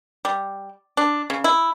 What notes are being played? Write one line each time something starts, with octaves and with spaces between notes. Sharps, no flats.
G3
D4
C#3
E4